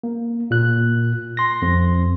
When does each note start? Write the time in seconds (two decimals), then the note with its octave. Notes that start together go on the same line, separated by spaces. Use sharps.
0.03 A#3
0.51 A#2 F#6
1.37 C6 A#6
1.62 F2